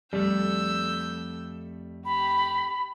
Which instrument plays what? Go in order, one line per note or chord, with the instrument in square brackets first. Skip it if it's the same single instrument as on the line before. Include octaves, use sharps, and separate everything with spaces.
[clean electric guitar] F2 A3 [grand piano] G3 [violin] E6 G6
[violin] G4 [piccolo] B5